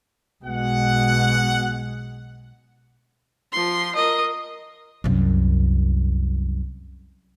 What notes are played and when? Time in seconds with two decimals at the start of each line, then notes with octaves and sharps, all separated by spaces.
0.45 B1 B2 G#3 F#5
3.52 F3 C6
3.95 A#4 D#5
5.04 C2 F#2